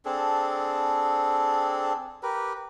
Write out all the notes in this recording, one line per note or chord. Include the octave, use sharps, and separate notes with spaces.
C4 D4 G#4 A4
G4 A#4 B4